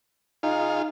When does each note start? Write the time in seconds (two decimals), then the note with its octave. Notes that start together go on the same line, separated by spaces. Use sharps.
0.43 D#4 F4 G#4 F5